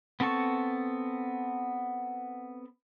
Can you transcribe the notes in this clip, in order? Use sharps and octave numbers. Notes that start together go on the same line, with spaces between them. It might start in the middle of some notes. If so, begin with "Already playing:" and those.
B3 C4 A4 A5 C#6